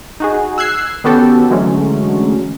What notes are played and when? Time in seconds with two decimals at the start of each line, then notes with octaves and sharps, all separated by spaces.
0.20 D#4 F#4 G#4
0.58 E6 F#6 G#6 C7
1.04 D#3 B3 C#4 F#4 G4 A4
1.50 D3 E3 F#3 G#3 A3 C#4